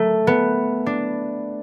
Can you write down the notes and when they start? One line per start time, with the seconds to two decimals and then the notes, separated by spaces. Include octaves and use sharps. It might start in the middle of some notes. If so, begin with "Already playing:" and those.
Already playing: A3
0.27 B3
0.86 D4